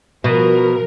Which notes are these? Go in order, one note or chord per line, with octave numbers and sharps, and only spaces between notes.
B2 F3 A#4